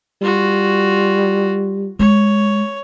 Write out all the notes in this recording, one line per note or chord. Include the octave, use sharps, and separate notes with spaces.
G3 F4 F#4
G#3 C#5